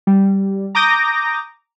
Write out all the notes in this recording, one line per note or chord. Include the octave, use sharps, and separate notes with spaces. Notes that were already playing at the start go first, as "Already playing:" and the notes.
G3
A#5 D6 D#6 G6 A#6